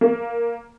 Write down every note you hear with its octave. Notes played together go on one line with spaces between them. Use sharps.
A#3